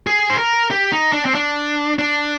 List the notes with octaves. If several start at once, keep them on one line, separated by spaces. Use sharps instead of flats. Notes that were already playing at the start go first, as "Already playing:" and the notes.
G#4
C5
A#4
G4
D#4
D4
C4
D4
D4